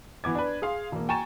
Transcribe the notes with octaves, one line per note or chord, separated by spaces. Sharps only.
E3 B3 D6 G#6
D4 B4
G#4 F5 C6
E1 A#3
G5 G#5 A#5 C#6 A6 E7